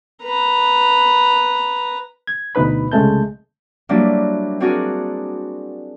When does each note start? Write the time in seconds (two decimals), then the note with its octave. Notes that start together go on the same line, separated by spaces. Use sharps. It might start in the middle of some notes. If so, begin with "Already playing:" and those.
0.23 B4 A#5
2.27 G#6
2.55 D2 B2 D#4 B4 B5
2.92 C2 C#3 G#3 A3 A5 G6
3.89 F#3 G3 A#3 D4 E4
4.60 C4 D4 F#4 G#4 A#4